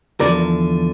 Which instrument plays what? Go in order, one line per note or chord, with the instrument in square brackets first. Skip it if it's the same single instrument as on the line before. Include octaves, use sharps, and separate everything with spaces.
[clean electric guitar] E2 D3 F3 A#4 D5